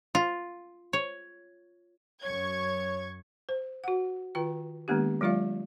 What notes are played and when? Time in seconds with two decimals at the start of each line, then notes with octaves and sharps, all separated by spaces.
0.15 F4
0.93 C#5
2.24 F#2 C#5 C#6 G#6
3.49 C5
3.84 F#4 F#5
4.35 D#3 F4 B4 G5
4.88 D#3 G#3 A#3 B3 D4 G4
5.21 F#3 G#3 F4 D5 F5